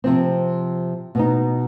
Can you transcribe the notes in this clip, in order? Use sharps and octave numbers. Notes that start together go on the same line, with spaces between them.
C3 F3 C4
B2 B3 D#4